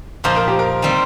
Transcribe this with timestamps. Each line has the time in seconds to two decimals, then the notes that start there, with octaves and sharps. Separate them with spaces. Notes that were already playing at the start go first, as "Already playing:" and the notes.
0.24 A#2 F3 D#4 C5
0.36 A#4
0.48 G4
0.59 A#4
0.82 D#3 G3 C4